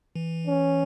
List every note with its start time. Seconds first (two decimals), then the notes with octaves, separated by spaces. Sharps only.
0.15 E3
0.47 C#4